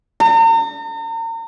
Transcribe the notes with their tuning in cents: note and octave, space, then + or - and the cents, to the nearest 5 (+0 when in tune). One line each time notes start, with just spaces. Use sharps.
A#5 -40